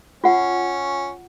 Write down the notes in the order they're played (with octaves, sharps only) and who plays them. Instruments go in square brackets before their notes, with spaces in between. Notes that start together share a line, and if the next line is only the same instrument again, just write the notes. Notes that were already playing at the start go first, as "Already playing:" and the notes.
[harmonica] C#4 [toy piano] F4 F#5